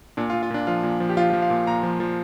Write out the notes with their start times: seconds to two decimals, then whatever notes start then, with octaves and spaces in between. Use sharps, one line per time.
0.17 A#2 D4
0.30 F4
0.33 A#2
0.43 F4
0.50 A#2 D4
0.67 F3 F4
0.83 A#2
1.00 F3
1.09 G4
1.17 F3 F4
1.30 F4
1.33 F3
1.42 F5
1.50 A#2
1.67 A#2 A#5
1.83 F3
2.00 F3